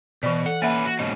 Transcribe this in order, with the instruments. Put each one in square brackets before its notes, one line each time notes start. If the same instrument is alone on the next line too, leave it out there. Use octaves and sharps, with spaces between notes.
[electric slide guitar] B2 [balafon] E3 D5
[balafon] A4 [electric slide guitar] F#5
[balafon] A#3 E5 F#5 [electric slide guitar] C#4 B4
[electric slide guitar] F#4
[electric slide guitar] G#2 B2 C#4 [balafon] D#5